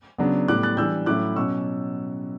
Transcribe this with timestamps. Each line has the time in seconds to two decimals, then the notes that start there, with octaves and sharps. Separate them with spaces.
0.18 C#3 F#3 B3 D4
0.48 A2 G3 B3 D6 F#6
0.63 F#6 A6
0.77 E3 G3 D4 E6 G6
1.06 A2 F#3 C#4 E4 D6 F#6
1.36 B2 F#3 C#4 C#6 E6